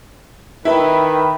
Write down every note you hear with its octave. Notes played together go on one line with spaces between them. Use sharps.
D#3 E4 B4 G5 A5 B5